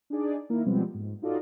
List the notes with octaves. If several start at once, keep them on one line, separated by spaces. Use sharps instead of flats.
D4 D#4 G#4 D5
D#3 A#3 E4 A#4
B2 F3 G3 G#3 B3 C4
G#2
D#4 F4 F#4 A4 D5 D#5